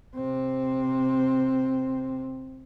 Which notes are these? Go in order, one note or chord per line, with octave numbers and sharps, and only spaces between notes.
C3 C4